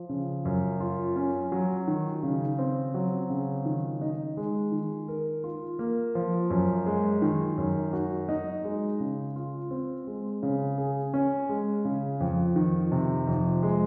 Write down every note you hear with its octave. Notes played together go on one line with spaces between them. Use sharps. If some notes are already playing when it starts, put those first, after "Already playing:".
Already playing: F3
C#3
F#2
F4
C#4
F#3
D#3
C#3
C4
F#3
C#3
D#3
D#4
G#3
D#3
A#4
F4
A#3
F3
F#2
G#3
D#3
F#2
F#4
D#4
G#3
C#3
F4
C4
G#3
C#3
G#4
C#4
G#3
C#3
F2
D#3
C3
F2
G#3